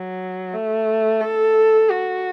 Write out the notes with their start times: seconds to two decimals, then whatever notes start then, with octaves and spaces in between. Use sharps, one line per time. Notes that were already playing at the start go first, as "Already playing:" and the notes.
Already playing: F#3
0.54 A3
1.21 A4
1.89 F#4